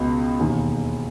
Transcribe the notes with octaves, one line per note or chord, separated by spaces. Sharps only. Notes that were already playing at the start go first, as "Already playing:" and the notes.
Already playing: C#2 B2
E1 D#2 D#3